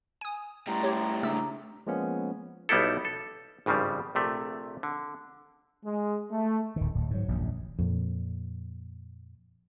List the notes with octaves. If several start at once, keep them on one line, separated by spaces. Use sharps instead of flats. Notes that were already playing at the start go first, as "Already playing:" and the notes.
G#5 D#6
A2 G3 A#5 C6
G4 C#5
C#3 A3 D4 A#5 E6
F3 G#3 A#3 B3 C#4
B1 G3 B3 D#4 E4 A4
A4
G#1 G2 C#3 F3 G3
A#1 C3 A3 G4
D3
G#3
A3
D1 D#3
D1
G#2 F#3
D#1 A#1 F#2
F2 A#2